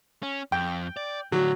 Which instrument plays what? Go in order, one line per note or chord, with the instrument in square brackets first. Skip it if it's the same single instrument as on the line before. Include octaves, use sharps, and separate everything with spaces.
[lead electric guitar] C#4
[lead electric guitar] F2 [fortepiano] G5
[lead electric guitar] D5
[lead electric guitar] A2 D3 [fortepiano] F#3